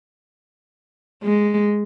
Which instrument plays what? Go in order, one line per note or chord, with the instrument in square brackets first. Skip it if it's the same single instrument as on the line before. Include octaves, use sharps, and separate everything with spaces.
[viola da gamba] G#3